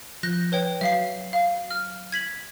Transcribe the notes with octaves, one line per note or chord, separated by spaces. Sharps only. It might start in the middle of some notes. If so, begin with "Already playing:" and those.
F3 F#6 G6 A#6
B4 C#5 G5
F#3 E5 F5 C7
F5
F6
G#6 B6 F#7